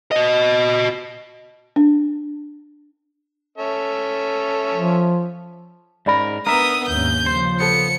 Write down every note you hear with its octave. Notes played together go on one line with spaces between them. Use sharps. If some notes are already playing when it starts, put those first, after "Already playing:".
F#4 D#5
D4
C#4 A4 E5
F3
G#2 C#4 A#4 D5 B5
B3 D4 A#4 E5 A#5 D#6
D#2 G#2 C#4 G6
C#3 F3 C5
B3 A4 C5 C#7